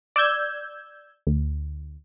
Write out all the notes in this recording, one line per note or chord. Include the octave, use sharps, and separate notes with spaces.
D5 E6 G6 G#6
D2